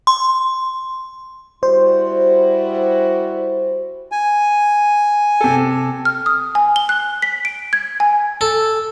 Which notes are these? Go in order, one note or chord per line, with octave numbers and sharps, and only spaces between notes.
C6
G3 E4 F#4 C5
G#5
C3 A4
F6
D#6
G#5
G7
F#6
B6
D7
G#6
G#5
A4